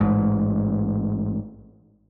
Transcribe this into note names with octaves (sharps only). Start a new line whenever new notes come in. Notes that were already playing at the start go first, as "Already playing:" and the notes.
A1 G#2